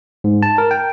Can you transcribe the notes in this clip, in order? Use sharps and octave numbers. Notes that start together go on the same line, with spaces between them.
G#2
A5
A#4
G5